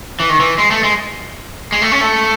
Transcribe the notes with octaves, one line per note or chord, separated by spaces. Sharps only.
E3
D#3
E3
G#3
A3
G#3
G#3
A3
C#4
A3